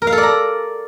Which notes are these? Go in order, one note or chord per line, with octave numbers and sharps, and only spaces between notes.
A#4
F5
A4
D5
A#5